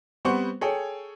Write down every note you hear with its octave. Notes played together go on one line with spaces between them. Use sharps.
G3 B3 C4 C5 F#5 C#6
G#4 A4 C#5 G5